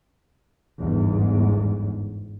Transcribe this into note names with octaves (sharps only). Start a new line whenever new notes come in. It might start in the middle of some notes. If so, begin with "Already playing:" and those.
G1 E2 G#2